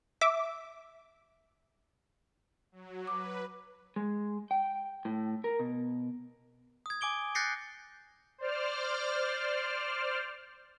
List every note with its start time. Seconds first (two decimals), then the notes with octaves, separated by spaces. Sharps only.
0.21 E5 D6
2.72 F#3
3.07 B4 D6
3.96 G#3
4.51 G5
5.05 A2
5.44 A#4
5.59 B2
6.86 D#6 G#6
7.01 G#5 D6 D7 G7
7.35 F#6 G6 A6 A#6 C7 C#7
8.38 C5 D5 F6